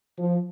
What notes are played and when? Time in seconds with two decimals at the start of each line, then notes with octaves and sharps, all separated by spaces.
0.19 F3